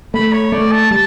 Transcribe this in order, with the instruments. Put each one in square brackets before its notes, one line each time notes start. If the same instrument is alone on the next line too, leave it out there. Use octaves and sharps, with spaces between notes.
[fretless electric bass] A3 [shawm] B5
[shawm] C#5
[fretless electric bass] A3 [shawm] D5
[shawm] A5
[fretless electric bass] G3 [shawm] A5